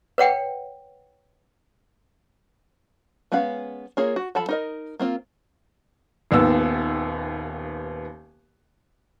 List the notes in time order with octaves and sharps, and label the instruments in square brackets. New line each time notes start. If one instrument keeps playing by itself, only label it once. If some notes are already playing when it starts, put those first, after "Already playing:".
[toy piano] B4 C#5 F#5 G5
[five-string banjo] G#3 B3 C#4 B4 F5
A#3 F4 G#4 A#4 C#5
F#4
F3 A4 A5 B5
D#4 A#4 D#5
A#3 C4 F4
[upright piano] D#1 D#2 B3 E6